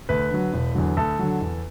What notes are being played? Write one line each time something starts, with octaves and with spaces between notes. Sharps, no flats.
D2 B4
D3 F#3
E1
E2 D3 F#3
D2 A4
D3 F#3
E2